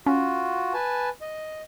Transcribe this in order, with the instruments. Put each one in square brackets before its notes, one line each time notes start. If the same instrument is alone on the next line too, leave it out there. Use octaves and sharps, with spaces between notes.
[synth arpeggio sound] C#4 [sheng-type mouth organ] F4 F#4
[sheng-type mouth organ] B4 G#5 A5
D#5